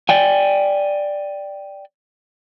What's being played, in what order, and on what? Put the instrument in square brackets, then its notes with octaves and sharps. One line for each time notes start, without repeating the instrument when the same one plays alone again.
[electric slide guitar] D5 G5 G#5